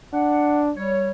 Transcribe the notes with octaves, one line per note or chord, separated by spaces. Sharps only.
D4 F#5
G3 C#5